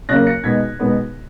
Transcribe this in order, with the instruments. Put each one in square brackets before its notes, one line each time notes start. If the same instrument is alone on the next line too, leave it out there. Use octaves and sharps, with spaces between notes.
[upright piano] C#3 F#3 A#3 F#6 A#6
A#6 C#7
B2 G#3 B3 D#4 G#6 B6
B2 G#3 B3 D#4